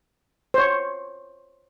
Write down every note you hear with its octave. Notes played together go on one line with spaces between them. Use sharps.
C5 C#5